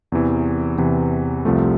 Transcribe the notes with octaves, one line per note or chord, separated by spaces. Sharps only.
E2 C3 E3
E2 C3 E3
C2 C3 F3 A3